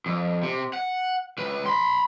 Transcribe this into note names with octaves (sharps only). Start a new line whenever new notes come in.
F2
C3
F#5
C#2 B4
B5 C6